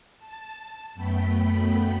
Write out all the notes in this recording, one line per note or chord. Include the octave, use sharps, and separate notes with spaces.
A5
F#2 A3 B3 G5 B5 B6